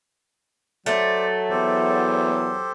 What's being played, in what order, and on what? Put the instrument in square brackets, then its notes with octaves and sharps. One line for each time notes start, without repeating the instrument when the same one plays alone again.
[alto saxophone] F#3 [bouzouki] A3 [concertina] C5 D5
[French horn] E2 [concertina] G4 A4 C5